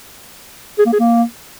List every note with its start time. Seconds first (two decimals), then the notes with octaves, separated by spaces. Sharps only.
0.79 G#4
0.86 A#3
0.93 G#4
1.00 A#3